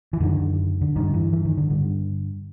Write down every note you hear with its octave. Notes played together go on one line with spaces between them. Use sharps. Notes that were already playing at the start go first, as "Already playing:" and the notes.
E3
F#2 D3 D#3
D3
G2 D3 D#3
E3
E3
D#3
D3
G2 D3